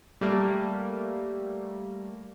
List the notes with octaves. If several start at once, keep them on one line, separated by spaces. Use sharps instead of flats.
G3 A3 A#3